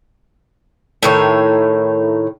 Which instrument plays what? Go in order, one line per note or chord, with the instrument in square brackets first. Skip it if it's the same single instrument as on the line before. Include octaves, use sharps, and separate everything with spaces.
[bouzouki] A2 D#3 C#5